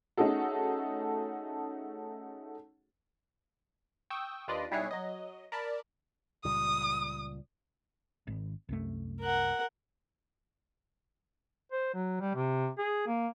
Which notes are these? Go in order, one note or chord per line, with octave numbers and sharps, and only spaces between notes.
A3 C#4 D#4 F#4 G#4 A4
G5 C#6 D#6 E6
D#2 D4 F4 B4 D5 D#5
B1 G3 E4 G#4 C#5 F#6
F#3 D#5
A#4 D5 A5 B5
C#2 A#2 G3 D#6
G#1
C2 F#2 A3
A#4 F#5
C5
F#3
G3
C3
G#4
A#3